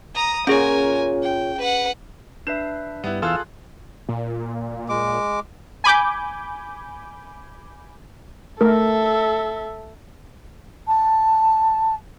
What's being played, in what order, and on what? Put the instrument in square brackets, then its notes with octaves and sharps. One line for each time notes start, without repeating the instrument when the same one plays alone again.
[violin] A#5 D#6
[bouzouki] A#2 C#5 [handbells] C#4 G#4 [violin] A#4 G#5
[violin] G5
B4 F#5
[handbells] D4 B4 E5 [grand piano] E7
[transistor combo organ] G2 [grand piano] B3 E4
[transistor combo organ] E2 F5 E6 [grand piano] F4 G#4 A4 [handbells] C6 F#6
[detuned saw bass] A#2
[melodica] G#3 D6
[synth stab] G#5 B5 D6 G6
[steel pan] A3 A#4 [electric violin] A4 E5
[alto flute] A5